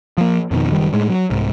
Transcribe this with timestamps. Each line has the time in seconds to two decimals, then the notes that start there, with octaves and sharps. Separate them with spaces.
0.18 F3 A#3
0.51 F2 B2 D#3
0.72 F#1 D#3 G3
0.93 A2 G#3
1.09 F#3
1.30 C2 G#2